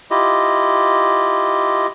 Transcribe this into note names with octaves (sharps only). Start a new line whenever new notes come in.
E4 F4 G4 D#5